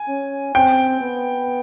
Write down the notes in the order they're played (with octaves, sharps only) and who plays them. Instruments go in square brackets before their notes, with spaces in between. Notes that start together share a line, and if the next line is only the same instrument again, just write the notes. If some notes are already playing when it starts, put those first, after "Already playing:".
Already playing: [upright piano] G#5
[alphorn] C#4
[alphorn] C4 [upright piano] G5
[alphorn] B3